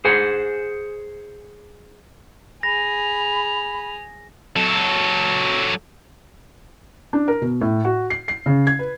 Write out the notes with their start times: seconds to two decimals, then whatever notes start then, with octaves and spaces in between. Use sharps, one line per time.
0.05 G#4 C5 F#5 G#5
2.63 G#4 B5 A#6 F7
4.56 F#3 A4
7.13 D4
7.28 A#4
7.42 B2
7.61 A2
7.85 F#4
8.10 C7
8.28 C7
8.46 C#3
8.67 G#6
8.79 B4